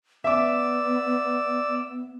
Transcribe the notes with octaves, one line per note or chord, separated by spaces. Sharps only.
B3 D5 E5 D6 E6